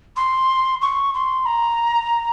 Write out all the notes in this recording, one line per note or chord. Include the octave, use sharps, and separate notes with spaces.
C6
C#6
C6
A#5